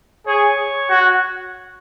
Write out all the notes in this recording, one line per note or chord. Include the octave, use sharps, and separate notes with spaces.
G#4 C#5
F#4